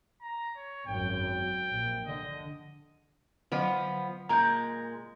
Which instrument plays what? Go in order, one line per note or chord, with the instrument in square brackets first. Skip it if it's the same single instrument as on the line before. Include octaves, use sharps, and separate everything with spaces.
[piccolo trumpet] A#5
C#5
[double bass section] G#1 F#2 F#3 [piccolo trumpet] G5
[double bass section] A#1
[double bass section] D3 [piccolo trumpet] D#5
[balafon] D3 F#3 [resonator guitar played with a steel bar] F3 B3
[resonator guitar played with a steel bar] A#2 G#3 [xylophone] A#5 G6